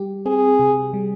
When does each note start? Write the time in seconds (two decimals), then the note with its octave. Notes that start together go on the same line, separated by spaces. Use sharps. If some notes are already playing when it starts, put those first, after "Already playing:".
Already playing: G3 G4
0.25 C4 G#4
0.59 C3
0.94 G3